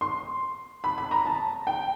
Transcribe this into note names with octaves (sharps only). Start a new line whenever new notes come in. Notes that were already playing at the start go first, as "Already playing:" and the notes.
C6
B5
B5
A#5
A5
G5